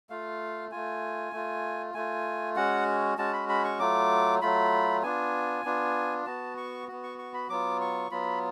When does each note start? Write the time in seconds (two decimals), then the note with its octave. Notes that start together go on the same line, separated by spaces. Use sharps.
0.10 A3 F4 F5
0.71 A3 F4 G#5
1.33 A3 F4
1.94 A3 F4 G#5
2.56 G#3 C#4 F#4 F#5
3.18 G#3 C#4 F#4 A5
3.33 B5
3.49 B5
3.64 C#6
3.79 F#3 A3 F4 D6
4.41 F#3 A3 F4 B5
5.03 B3 D4 F4 G#5
5.64 B3 D4 F4
6.26 B3 F#4 A5
6.57 C#6
6.87 B3 F#4
7.03 C#6
7.18 C#6
7.34 B5
7.50 F#3 B3 F4 D6
7.81 C#6
8.11 F#3 B3 F4 B5